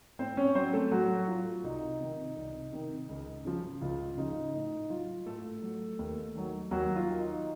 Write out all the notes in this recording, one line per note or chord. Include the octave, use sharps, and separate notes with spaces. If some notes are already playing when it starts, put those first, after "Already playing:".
A2 C4 C5
C#4 C#5
F#3 C4 C5
A3 A4
A2 F#3 F#4
F#3 F4
C2 D#4
C3 D#3
C2
C3 D#3
C#2
C#3 F3
C#2 F4
C#3 F3 D#4
A2 D#4
F#3 F4
A2 A3 A4
F#3
D#2
D#3 F#3
D#2 F#3 F#4
F4
D#3 F#3
D#4